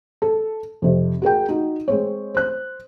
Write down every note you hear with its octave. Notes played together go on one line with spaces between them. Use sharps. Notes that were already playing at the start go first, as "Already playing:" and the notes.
A4
F2 C3
F#4 G#4 A#4 G5
D#4 F#4
G#3 C4 C#5
C5 F#6